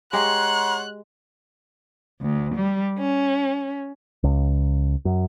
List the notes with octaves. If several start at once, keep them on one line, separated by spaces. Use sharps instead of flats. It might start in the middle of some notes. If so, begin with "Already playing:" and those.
G#3 G4 C#5 F#5 A#5 C6 F#6
D2
G3
C#4
C#2
F#2